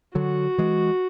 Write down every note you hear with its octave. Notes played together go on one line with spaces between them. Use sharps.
D3 F#3 F#4
E3 G#3